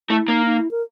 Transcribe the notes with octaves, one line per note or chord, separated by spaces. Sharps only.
A3 E4
A#3 D#4
D#4
E4
A#4